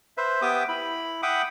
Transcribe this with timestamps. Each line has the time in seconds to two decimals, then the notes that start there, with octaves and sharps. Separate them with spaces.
0.17 B4 C5 E5
0.42 B3 G4 E5 G5 D6 D#6
0.69 E4 B5
1.23 E5 F#5 G5 B5 D6 D#6